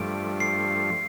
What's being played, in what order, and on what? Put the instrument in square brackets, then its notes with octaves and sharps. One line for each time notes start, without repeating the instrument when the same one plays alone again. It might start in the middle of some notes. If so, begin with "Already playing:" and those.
Already playing: [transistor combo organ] G2 F3 A3 [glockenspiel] D7
[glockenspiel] C7